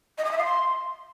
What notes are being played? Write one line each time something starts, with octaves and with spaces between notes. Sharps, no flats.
D#5
D#6
E5
F5
C6